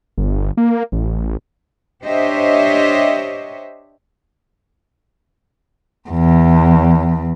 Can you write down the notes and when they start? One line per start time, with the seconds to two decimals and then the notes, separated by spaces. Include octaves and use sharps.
0.18 G1
0.57 A#3
0.92 A1
2.04 D4 G4 C5 C#5 D#5 E5
6.10 E2